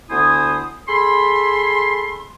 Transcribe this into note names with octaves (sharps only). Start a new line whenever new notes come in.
D2 B3 E4 C5 G#5 D#6
G#4 A4 B5 C6